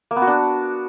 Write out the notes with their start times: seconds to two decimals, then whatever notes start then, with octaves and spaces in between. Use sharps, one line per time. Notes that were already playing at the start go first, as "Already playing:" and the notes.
0.11 A#3
0.16 B3
0.22 F#4
0.27 D4